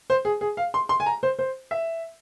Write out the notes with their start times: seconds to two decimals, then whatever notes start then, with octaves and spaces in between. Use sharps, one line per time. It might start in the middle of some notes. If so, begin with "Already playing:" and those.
0.10 C5
0.25 G#4
0.41 G#4
0.57 F5
0.74 C6
0.89 C6
1.00 G#5
1.06 A#5
1.23 C5
1.39 C5
1.71 E5